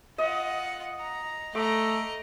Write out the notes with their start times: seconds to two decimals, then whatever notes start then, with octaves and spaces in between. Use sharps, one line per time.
0.18 F4 D#5 F#5
0.99 A#5
1.55 A3 D#5 A#5 D6